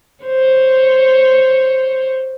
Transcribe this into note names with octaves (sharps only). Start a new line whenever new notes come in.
C5 C#5